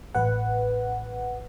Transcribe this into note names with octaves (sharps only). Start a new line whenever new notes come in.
A1 B4 F#5